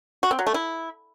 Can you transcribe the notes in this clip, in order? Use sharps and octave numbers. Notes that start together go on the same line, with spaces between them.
F#4
C4
F#3
A3
E4